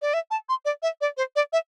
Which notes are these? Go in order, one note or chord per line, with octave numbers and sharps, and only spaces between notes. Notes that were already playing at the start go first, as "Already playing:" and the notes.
D5
E5
A5
C6
D5
E5
D5
C5
D5
E5